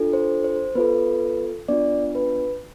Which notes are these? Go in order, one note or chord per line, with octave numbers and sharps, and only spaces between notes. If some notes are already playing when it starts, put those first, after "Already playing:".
Already playing: D4 F4 A4
C5
C5
B3 F4 A4 B4
B3 D4 F4 D5
B4